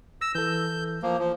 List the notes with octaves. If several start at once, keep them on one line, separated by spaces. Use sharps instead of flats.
E6 A#6
E3 A4 G6
F3 A#3
F3